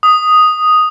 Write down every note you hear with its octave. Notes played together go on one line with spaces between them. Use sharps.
D#6